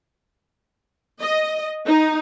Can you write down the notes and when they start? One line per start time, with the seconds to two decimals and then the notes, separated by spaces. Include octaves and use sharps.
1.21 D#5
1.87 D#4